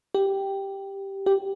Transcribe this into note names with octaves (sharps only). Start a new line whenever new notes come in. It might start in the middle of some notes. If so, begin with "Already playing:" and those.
G4
G4